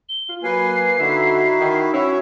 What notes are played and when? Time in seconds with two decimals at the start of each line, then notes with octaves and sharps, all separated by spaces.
0.09 G7
0.29 F4
0.43 F#3 A#3 B4 G#5 C7
1.00 D3 D#4 E4 F#4 E5
1.60 D#3
1.93 C#4 E4 F#4 C#5 E5